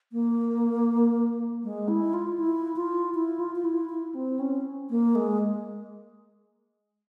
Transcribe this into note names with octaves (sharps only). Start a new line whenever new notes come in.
A#3
G#3
E4
F4
E4
F4
E4
F4
F4
E4
E4
C4
C#4
A#3
G#3